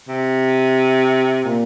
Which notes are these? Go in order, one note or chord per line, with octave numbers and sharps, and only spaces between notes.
C3
A#2